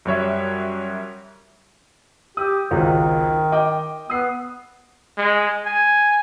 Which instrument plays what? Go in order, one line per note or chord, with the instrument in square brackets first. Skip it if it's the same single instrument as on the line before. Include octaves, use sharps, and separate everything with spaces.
[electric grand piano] F#2 G3 C#5 E5
[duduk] G4 [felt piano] D#6
[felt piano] G#1 C#2 G#2 [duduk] D#3
[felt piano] D#5 G5 D6
[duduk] B3 [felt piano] D#6 C7
[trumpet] G#3
G#5